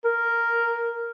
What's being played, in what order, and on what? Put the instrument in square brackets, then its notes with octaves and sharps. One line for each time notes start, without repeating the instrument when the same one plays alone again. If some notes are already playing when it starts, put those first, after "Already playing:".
[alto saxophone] A#4